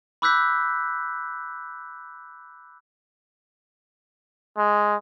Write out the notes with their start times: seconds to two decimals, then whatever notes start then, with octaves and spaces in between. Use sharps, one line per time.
0.22 B5 D6 E6 F#6 G6 B6
4.58 G#3